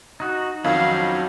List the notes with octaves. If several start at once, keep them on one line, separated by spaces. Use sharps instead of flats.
D#4 F#4
F2 D#3 F#3 C#4 F5